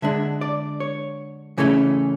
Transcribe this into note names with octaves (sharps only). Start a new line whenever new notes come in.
D3 G#3 D4 E5
D5
C#5
C#3 E3 A3 C#4